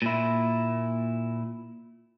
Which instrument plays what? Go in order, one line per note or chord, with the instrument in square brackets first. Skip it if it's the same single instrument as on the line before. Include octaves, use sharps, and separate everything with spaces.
[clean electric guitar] A#2 E4